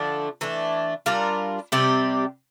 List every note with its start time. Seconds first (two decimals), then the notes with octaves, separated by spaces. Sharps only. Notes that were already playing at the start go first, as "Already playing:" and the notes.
Already playing: D3 F3 A3 D4
0.41 E3 A3 D4
1.06 G3 D4 F4 A#4
1.72 C3 G3 C4 G4